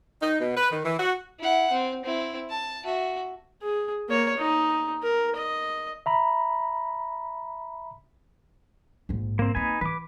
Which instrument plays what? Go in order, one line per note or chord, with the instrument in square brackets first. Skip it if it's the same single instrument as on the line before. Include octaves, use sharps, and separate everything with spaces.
[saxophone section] D#4
B2
B4
D#3
E3
F#4
[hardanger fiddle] E4 F#5
C4
C4 E4
A5
F#4 E5
[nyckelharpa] G#4
A#3 C#5
D#4
A#4
D#5
[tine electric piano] E5 A#5 B5
[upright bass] A#1 G#2
[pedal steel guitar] A#3 C4
[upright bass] A#3 C4 [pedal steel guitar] D#4 B4 G#5
[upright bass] E3 [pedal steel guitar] B4 D6